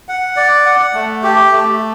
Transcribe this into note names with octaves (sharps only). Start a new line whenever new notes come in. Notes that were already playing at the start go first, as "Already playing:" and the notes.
F#5
D5
F#5
A3
G4
A3